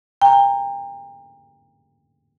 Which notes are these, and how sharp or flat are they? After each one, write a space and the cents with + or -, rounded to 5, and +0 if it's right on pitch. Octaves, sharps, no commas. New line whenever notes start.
G5 +35 A#5 -10